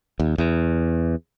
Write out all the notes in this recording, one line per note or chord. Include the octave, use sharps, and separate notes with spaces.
D#2
E2